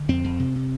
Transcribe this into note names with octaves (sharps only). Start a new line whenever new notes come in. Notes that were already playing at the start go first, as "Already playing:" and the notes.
Already playing: D3
F2 C4
F2
C3
C3